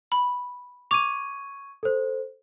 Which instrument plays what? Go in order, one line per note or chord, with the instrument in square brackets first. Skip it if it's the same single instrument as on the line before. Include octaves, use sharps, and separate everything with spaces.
[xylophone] B5
[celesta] C#6 G#6 D#7 [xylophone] D6 F7
[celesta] A4 C5